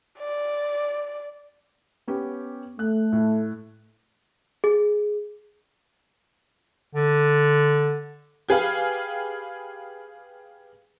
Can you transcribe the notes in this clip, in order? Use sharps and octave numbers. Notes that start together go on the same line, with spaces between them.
D5
B3 C#4 G4
A3 F#6
A2
G#4
D3
G4 G#4 B4 F5